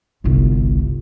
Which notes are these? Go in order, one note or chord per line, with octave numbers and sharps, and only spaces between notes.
G1 C2